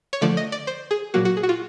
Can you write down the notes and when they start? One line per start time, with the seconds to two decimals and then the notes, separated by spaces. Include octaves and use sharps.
0.13 C#5
0.21 D3 F3 A3 D5
0.37 D#5
0.52 D5
0.67 C5
0.91 G#4
1.14 A#2 F#3 A#3 F#4
1.25 F#4
1.37 G#4
1.43 F#4
1.49 F4